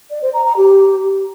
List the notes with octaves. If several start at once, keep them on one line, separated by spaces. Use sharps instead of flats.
D5
C5
A#5
A#5
G4